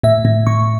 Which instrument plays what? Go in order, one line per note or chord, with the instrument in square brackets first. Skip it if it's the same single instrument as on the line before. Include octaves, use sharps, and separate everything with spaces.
[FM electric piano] A2 E5
A2
A2 C#6